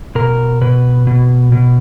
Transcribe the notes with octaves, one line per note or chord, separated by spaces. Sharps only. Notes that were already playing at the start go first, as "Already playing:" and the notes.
B2 A#4
B2 B4
B2
B2